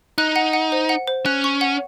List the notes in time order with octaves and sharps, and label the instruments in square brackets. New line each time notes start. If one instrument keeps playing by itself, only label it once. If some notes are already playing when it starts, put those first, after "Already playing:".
[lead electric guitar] D#4 [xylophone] F#6
[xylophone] F#5
F#5
C5
F#5
C5
[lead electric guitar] C#4 [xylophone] F#6
[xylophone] C#6
F#5